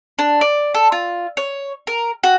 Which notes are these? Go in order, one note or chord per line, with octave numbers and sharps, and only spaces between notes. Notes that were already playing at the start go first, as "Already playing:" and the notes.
D4
D5
A4
F4
C#5
A#4
F#4